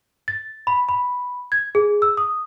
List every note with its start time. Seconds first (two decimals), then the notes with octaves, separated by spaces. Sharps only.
0.28 A6
0.67 B5
0.89 B5
1.52 G#6
1.75 G#4
2.02 E6
2.17 D#6